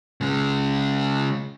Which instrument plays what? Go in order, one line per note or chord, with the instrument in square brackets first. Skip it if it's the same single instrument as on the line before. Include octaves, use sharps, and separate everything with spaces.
[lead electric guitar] C#3 G#3